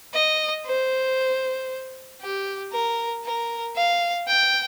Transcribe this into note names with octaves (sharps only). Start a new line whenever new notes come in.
D#5
C5
G4
A#4
A#4
F5
G5